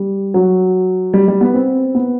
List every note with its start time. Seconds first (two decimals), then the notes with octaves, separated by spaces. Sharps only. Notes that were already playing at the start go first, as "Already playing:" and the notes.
Already playing: G3
0.34 F#3
1.14 G3
1.28 G3
1.41 B3
1.54 C4
1.95 B3